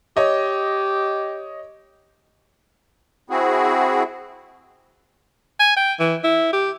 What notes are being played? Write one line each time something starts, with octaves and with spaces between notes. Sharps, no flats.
G4 C#5 D#5
C4 E4 F#4 G#4
G#5
G5
E3
E4
G4